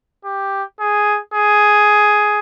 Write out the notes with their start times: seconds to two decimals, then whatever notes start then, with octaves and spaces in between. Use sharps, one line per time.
0.25 G4
0.80 G#4
1.34 G#4